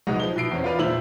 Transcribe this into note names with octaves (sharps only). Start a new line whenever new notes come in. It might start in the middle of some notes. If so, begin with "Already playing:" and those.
C2 B2 G#3 D#4 D#5 F#5
F3 G7
B2 E4 C7 D7
E2 C4 C#4
F4 A#4 B4 D5 E5 F5
E1 A#2 E4 C5 E6 F#7